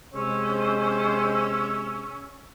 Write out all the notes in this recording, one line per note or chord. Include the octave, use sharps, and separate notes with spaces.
C3 G#3 C#4 C5 E6